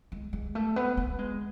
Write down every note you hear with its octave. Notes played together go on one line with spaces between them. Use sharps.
G#3
G#3
A3
B3
B3
G#3